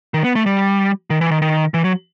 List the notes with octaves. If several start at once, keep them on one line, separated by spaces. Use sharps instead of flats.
D#3
B3
A3
G3
D#3
E3
D#3
D#3
E3
F#3